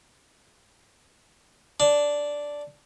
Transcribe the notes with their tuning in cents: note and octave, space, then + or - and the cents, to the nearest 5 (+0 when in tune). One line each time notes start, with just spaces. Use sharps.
D4 -5